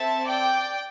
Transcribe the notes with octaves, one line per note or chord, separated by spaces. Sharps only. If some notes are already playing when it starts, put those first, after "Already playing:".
Already playing: C4 A4 E5 A5
D5 G5